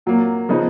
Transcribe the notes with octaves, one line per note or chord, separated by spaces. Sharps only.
A#2 F#3 A#3
C#3 F3 B3 D#4